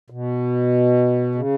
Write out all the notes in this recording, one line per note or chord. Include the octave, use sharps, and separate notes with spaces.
B2
C#3